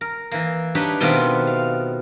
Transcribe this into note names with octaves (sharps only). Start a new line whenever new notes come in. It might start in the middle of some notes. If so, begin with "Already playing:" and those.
A#4
E3 A#3
D4 D#4 G4 B4 C#5
B2 D#3 A3 B3 C4 F4
F5